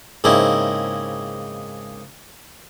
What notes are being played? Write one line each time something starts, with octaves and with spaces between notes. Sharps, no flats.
G#2 C#3 A#3 C4 D#4 E4